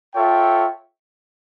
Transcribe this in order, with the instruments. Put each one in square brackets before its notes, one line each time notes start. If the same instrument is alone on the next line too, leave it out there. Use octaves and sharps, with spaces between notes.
[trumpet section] F4 A4 C#5 E5 G5